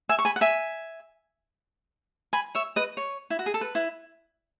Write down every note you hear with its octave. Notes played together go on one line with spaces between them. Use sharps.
E5 G#5
C#6
G#5 B5
F#5
E5 G#5
G#5 B5
C#5 E5
B4 D#5
C#5
E4
F#4
G#4
A4
B4
E4